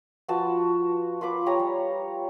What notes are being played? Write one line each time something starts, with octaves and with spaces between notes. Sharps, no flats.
F3 F#4 B4 A5
F4 B4 B5 D6
G4 C#5 G#5 A#5
G3